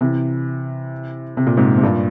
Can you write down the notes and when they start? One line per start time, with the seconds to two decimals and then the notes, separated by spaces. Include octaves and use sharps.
0.01 C3 E3
1.37 C3
1.47 A#2
1.57 G#2 C3
1.78 C3
1.83 G2 A#2